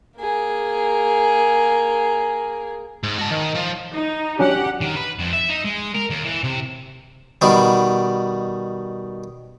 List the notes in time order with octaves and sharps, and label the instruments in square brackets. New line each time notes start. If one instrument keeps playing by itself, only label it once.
[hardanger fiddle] A#3 G#4
[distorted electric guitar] G#2
F#4 A5
D#3
F3
[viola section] D#4
[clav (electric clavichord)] F#3 C#4 D4 [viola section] G4 F#5
[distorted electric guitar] D#3
B4
F2
E5
D#4
G#3
A#4
D#2
E3
C3
[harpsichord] B2 D#3 G3